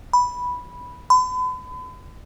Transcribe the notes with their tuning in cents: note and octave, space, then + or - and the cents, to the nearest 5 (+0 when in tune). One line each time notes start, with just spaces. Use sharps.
B5 -5
B5 +40